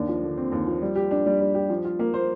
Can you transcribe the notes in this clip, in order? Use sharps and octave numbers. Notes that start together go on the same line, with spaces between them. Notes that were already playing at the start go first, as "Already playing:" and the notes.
Already playing: D#2 D4
F3
D3
C4
D#2
F3
G3
G4
D4
G3
G3
G4
F3
F4
A#3
C5